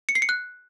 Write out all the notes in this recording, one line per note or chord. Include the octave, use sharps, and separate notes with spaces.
C#7
C7
C#7
F#6